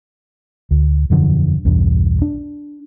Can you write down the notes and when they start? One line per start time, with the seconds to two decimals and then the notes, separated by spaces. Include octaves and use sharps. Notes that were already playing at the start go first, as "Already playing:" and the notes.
0.71 D2
1.10 E1 F#2 D3 F3
1.65 B1 E2 G2
2.22 D4